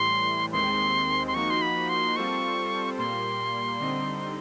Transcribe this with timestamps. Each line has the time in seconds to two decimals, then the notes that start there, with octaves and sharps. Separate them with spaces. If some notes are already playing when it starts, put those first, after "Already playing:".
Already playing: A2 E3 G3 C6
0.52 D#2 D#3 G#3 C4 C6
1.27 C6
1.34 F3 A#3 D#4 F#4 C#6
1.50 C6
1.62 B5
1.89 C6
2.16 G3 C4 F4 A4 C5 C#6
2.98 A#2 G3 A#3 C6
3.80 D3 G3 C4 D#4